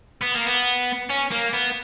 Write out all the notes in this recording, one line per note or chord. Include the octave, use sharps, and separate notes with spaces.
B3
A#3
B3
C#4
A#3
B3